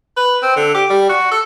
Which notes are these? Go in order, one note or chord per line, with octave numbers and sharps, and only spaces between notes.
B4
C4
D3
G4
G3
F#4
A4